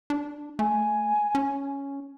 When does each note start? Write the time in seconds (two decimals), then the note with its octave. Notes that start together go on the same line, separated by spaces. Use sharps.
0.10 D4
0.59 A3 G#5
1.35 C#4